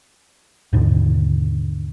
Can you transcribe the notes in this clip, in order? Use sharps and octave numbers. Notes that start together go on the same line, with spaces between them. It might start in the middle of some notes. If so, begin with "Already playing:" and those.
D#2 G#2 B2 D3